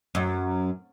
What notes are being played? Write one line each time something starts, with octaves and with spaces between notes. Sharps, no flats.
F#2